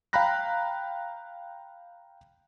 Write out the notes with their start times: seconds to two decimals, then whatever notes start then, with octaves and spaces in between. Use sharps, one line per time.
0.13 F5 G5 A#5 B5 F#6 A#6